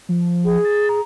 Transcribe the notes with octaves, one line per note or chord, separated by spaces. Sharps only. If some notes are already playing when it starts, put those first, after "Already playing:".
F3
G#4
A6
A#5